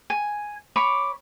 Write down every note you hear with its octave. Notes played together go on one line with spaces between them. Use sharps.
G#5
C#5 B5 D6